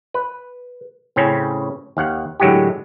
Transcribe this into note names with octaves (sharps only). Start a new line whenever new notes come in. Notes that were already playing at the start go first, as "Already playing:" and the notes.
B4
A2 C#3 C4 C#4
D#2 F5 F#5
A2 D3 F#3 G#3 F#4 G4